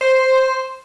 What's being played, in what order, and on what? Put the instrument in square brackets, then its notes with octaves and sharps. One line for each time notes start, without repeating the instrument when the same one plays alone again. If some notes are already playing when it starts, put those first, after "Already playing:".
[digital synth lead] C5